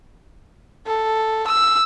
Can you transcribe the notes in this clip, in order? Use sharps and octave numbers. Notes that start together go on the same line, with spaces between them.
A4
E6